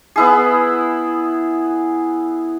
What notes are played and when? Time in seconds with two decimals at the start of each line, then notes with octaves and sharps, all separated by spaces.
0.16 B3 E4 G#4